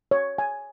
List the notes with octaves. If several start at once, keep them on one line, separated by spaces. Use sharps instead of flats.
C#5
G#5